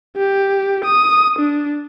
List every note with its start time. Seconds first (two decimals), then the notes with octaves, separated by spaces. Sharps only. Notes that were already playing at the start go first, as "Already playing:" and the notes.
0.16 G4
0.85 D#6
1.39 D4